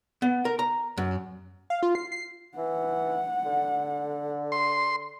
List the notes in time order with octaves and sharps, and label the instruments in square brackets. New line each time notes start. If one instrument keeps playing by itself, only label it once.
[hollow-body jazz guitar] B3
A#4
A#5
F#2
[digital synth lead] F5
F4
C7
C7
[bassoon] E3 [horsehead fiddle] F#5
[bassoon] D3
[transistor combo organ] C6